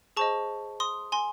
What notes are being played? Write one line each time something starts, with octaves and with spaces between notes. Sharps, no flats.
G#4 C5 D#5 A5 C#6
C6 D#6
G#5 C6